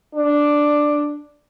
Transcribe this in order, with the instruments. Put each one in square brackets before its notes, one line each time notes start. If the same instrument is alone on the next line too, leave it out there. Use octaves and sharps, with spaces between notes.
[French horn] D4